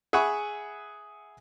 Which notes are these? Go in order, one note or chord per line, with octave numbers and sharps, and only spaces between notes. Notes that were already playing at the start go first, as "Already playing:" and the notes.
G#4 E5 F#5 B5 C#6